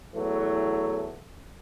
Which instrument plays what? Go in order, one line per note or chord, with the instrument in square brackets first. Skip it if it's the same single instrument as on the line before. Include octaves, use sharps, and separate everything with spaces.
[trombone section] E2 E3 F#3 A3